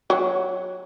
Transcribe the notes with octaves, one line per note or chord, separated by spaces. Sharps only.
F#3